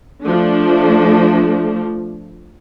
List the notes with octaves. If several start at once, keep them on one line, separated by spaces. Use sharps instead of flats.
F3 A3 D4